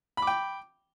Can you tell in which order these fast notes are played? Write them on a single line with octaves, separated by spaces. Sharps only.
B5 D6 G5